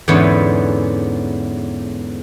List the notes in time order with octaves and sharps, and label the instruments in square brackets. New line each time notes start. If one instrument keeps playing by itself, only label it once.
[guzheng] E2 G#2 D3 E3 B3 C#4